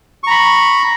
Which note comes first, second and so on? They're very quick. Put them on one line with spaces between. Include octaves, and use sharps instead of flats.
C#6 A#5 B5